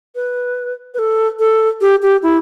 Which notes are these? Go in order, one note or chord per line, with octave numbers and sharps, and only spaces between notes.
B4
B4
A4
A4
G4
G4
E4